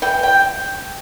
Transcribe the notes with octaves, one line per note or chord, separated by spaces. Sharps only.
E3 G5
G5